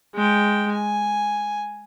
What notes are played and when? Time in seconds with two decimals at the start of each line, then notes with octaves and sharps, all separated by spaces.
0.15 G#3 G5
0.72 G#5